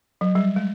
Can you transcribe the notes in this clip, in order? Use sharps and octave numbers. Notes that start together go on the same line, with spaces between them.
F#3
G3
G#3